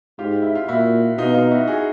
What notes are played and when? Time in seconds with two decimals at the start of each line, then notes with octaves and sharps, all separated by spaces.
0.19 G#2 F4 G4
0.42 E4
0.55 F4
0.68 A#2 E4 F#4
1.18 B2 D#4 F4
1.35 D#4 F4
1.51 E4 F#4
1.68 F#4 G#4